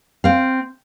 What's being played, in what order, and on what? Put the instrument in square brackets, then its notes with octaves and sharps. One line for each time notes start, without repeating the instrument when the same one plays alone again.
[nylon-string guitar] C4 F5